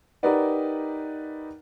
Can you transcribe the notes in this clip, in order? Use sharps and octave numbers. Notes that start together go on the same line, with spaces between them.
D#4 G4 A#4 B4 D5 F#5